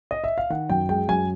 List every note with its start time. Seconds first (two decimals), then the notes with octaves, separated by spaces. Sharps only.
0.11 D#5
0.24 E5
0.38 F5
0.50 D#3 F#5
0.70 F#2 G5
0.89 G#3 G5
1.09 F#2 G#5